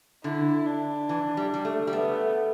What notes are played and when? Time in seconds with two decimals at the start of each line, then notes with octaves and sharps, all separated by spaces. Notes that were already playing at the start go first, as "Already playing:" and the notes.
0.24 D3 E4
0.67 D4
1.09 E3
1.37 G3
1.54 G3
1.65 A3
1.87 G3
1.93 A3 B3